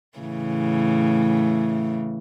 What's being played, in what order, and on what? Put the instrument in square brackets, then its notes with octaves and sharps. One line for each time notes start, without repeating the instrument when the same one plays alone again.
[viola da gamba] A2 C#3 E3